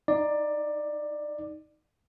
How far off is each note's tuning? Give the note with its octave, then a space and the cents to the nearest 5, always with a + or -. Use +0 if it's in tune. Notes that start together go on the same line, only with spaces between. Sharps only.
D#4 +5 D5 +15